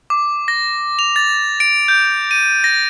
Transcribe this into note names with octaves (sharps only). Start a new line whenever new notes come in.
D6
A#6
F7
A6
D7
G6
D#7
A#6